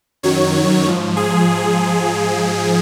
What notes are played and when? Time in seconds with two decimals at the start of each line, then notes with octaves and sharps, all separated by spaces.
0.23 F#2 D#3 F#3 C#5
0.86 G#2 F3
1.16 G#4